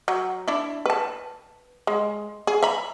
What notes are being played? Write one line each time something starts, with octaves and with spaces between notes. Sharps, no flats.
F#3
D4 E4
B4 A5
G#3
G#4
E5 A#5 B5